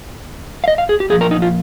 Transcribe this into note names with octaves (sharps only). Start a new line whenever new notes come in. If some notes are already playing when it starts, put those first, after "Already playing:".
F5
D#5
F5
G#4
G4
A#2 F3 G#4
A#4
D#4
F4